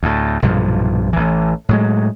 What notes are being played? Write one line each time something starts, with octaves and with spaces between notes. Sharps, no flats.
D2 A2
B1 G2 A#2 F3
A1 E3
A2 F#3 G#3